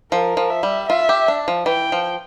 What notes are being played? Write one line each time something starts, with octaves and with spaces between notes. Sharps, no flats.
F3 A#4
F3
E5
G3
F4 E5
G4
D4
F3
E3 G5
F3